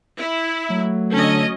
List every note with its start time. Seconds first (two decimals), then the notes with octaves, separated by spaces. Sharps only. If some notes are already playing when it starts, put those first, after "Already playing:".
0.17 E4
0.70 F#3 A3
1.12 D3 C#4 A4 D#5